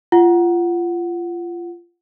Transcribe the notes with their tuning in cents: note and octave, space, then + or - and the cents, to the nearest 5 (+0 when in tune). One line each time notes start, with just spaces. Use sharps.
F4 -20 F#5 +0